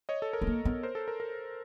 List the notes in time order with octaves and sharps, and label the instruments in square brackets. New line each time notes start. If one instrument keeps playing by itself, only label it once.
[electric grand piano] C#5 D#5
A4
A#4
[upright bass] B3
A#3
B3
[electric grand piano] A#4 C5
A4
A#4
A#4